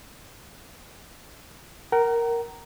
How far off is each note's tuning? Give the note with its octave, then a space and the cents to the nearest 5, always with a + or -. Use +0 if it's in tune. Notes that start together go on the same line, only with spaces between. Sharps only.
A#4 +0 F#5 +40